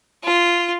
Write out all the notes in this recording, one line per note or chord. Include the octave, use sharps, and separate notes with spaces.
F4